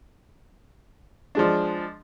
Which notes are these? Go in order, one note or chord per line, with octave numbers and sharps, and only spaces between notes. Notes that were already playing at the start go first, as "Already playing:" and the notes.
F3 G#3 D4